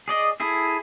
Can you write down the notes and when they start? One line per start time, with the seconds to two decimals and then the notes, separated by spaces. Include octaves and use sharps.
0.08 G#4 D5 D#5
0.40 E4 G#4 A4